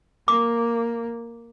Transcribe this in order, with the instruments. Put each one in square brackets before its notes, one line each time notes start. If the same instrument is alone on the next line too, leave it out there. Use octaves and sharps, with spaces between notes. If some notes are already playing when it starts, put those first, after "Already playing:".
[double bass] A#3 [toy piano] D6